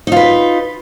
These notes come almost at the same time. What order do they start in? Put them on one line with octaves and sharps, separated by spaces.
D#4 F4 B4